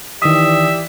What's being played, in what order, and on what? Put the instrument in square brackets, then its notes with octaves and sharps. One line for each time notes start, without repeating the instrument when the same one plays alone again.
[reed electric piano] D#3 D#6 [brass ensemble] E3 G4 D5 [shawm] E5